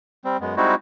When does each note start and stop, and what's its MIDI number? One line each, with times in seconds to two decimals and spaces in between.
0.25 0.37 55
0.25 0.37 60
0.41 0.55 42
0.41 0.55 56
0.41 0.55 59
0.57 0.75 55
0.57 0.75 56
0.57 0.75 60
0.57 0.75 63
0.57 0.75 64
0.57 0.75 66